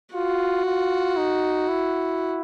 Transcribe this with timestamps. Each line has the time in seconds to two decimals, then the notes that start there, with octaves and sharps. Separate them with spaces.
0.14 F4 F#4
0.66 F4
1.17 D#4
1.69 E4